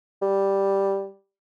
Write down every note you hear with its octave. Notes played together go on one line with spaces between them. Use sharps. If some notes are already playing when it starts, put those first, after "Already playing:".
G3